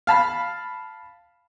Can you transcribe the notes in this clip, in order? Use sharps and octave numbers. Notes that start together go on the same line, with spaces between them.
F5 A5 B5